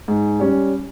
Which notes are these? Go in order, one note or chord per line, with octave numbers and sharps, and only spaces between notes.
G#2
G3 C#4